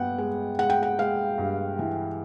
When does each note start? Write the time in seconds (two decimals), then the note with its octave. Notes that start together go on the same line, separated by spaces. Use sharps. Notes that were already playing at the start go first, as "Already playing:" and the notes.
Already playing: G2 B3 F#5 G5
0.18 G#3
0.59 G#3 F#5
0.70 G5
0.83 F#5
0.99 G#3 F5
1.38 G2
1.79 E3